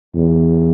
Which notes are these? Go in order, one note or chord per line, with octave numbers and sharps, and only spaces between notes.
E2